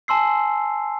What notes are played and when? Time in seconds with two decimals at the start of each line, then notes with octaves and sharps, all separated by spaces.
0.08 G#5 A5 C6 E6 C7